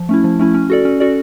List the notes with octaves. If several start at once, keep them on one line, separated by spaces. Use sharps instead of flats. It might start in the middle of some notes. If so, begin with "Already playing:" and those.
Already playing: F3
A3 C#4 E4
F3
A3 C#4 E4
C#4
F#4 A4 D5
C#4
F#4 A4 D5